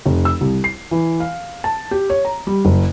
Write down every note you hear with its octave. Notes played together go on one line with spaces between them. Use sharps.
F1
E6
C2
C7
E3
F5
A5
G4
C#5
A#5
G3
F#1